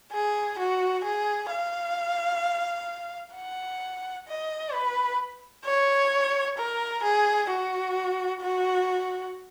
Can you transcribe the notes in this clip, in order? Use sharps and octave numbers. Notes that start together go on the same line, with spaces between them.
G#4
F#4
G#4
F5
F#5
D#5
B4
C#5
A#4
G#4
F#4
F#4